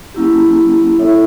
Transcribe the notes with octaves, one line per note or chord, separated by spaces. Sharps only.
F#3 A#3 C#4 E4 G4
E4 A4 C#5 E5